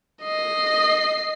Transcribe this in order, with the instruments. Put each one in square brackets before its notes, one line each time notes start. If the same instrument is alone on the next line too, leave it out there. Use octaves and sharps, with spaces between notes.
[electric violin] D#5 C7